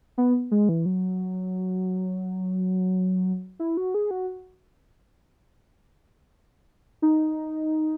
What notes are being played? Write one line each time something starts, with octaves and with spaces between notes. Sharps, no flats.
B3
G#3
E3
F#3
E4
F#4
G#4
F#4
D#4